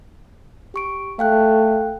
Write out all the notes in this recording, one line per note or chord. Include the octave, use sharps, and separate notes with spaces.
G4 C#6 D7
A3 F5 G5 F#6